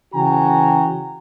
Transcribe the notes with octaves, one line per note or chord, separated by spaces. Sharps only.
C#3 E3 F#4 G5 G#5 A#5